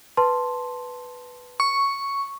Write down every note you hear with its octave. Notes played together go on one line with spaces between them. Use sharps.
B4 A5 C6
C#6